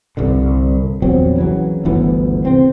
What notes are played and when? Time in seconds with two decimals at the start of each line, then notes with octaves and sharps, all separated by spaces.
0.17 C2 G2 D3
1.02 A#1 E2 F#3 C4
1.36 C#3 E3 F#3
1.85 G1 D2 E3 B3
2.45 C3 C4